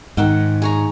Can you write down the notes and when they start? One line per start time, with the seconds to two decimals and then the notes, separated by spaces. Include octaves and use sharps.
0.17 G#2 D#3 F#5 G5
0.62 G#4 C#5 A#5